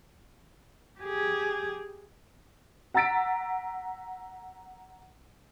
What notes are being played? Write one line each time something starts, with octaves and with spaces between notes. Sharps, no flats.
G4 G#4
F#5 A#5 E6 A6 B6 D7